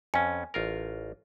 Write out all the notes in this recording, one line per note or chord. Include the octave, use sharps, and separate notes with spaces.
F2 C#4 G#5
A1 F4 A#4